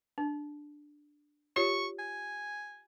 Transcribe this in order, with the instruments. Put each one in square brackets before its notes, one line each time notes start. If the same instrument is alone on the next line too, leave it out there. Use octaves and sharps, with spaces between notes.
[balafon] D4
[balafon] F4 G4 C#5 [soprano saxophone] C#6
[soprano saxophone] G#5